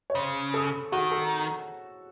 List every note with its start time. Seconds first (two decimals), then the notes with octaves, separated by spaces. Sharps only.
0.10 C#5
0.15 C#3 C5
0.54 A4
0.92 D#3 F#4
1.11 A4